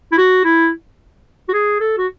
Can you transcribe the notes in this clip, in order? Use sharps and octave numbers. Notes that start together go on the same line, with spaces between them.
E4
F#4
E4
F#4
G#4
A4
F#4